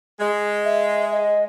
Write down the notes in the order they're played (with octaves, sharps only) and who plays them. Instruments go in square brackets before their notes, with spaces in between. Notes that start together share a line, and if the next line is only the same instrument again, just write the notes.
[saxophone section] G#3
[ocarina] E5
D#5